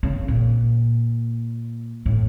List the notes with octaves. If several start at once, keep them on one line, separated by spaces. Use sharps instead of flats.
C#3
A#2
A2